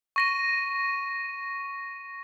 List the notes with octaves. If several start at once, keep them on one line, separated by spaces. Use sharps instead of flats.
C#6 A#6 D#7